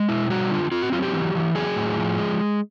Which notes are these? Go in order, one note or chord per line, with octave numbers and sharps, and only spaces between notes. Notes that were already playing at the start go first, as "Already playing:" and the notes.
Already playing: G#3
B2 E4
G3 F#4
D3 F4
C4 F4
F#4
F#3 F4
G4
E3
E3
F#3 G#4
A2
F3
G#3